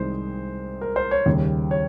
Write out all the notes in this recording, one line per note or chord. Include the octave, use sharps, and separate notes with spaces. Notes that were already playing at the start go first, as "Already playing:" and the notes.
Already playing: C2 C3 D#3 G#3 C5
A#4
C5
C#5
D#2 C#3 G3
C#5